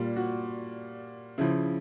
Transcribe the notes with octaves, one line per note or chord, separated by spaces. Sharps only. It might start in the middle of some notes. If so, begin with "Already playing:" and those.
Already playing: A#2 G3 F4
F#4
C#3 F3 E4